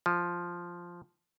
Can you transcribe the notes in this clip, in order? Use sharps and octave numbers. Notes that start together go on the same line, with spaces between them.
F3